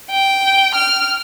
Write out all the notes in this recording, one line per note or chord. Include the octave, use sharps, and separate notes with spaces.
G5
F6